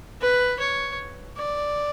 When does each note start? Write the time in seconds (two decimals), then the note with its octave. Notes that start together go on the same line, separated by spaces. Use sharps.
0.21 B4
0.59 C#5
1.38 D5